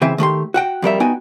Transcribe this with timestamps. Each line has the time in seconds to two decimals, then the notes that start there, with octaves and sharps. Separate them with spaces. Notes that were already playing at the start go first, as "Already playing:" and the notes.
0.02 C#3 E3 C4 E5
0.18 D#3 A3 G4 C6
0.54 F#4 F#5 G5
0.82 F2 G3 A#4 E5
1.00 B3 D#4 F#4 G5 G#5